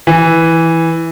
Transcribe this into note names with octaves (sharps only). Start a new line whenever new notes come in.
E3